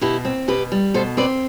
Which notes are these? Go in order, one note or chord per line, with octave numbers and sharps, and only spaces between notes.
B2 E4 G4
C4
B2 G4 B4
G3
B2 A4 C5
C4 B4 D5